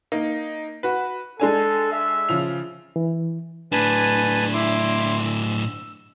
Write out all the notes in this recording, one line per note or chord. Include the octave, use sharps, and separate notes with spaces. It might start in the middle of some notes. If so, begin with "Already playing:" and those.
A#3 D#4
F#4 B4
G#3 D4 A4 G#5
E5
C#3 F3 F7
E3
A2 D4 B4 G#5 A5
E4 C6 D6
E6